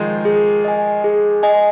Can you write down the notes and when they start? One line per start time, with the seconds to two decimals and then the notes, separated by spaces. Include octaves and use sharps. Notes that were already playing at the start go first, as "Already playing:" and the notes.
Already playing: D#3 F3 G#3
0.25 G#4
0.65 D#5 G#5
1.04 G#4
1.43 D#5 G#5